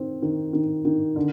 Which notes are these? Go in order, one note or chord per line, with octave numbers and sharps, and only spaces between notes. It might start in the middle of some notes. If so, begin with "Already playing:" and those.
Already playing: D#3 C4
D#3
D#3
D#3
D3